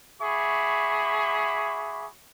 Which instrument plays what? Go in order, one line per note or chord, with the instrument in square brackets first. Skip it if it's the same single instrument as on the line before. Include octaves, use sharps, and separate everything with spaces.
[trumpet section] F#4 G#4 E5 B5 C#6 D6